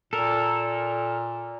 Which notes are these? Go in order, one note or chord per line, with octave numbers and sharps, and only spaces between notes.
A#2 A4 A#4